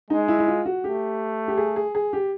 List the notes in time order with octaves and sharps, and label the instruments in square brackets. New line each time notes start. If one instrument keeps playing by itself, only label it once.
[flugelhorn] G#3 [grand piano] D#4
[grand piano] E4
E4
F4
F#4
[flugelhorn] A3 [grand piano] G4
[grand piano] G4
G#4
G#4
G#4
G4